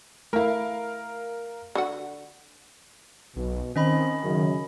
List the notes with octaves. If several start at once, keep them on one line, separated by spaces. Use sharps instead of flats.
A3 E4 A#4 F5
D3 F#4 F#5
B1 B2
D#3 C4 C#4 D#5 B5
F#2 C#3